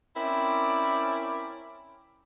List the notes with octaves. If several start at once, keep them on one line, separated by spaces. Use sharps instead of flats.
C4 C#4 E4 A#4 D5